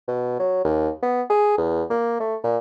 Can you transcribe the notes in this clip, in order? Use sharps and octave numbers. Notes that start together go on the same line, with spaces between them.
B2
F#3
D#2
B3
G#4
E2
A#3
A3
A#2